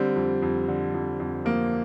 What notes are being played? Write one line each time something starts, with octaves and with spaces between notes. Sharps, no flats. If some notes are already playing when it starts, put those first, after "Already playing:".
Already playing: D3 G3 C4
F2
F2
D3
F2
F2
F3 A#3